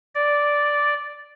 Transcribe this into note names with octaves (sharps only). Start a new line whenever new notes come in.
D5